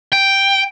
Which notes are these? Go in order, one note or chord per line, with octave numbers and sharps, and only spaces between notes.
G5